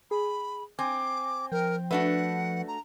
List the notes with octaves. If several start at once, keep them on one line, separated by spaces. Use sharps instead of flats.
G#4 B5
C4 G#5 D6
F3 A#4 G5
A3 D4 F#4 B4 F#5
A#5